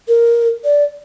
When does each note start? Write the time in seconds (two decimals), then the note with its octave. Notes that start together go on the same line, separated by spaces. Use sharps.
0.08 A#4
0.64 D5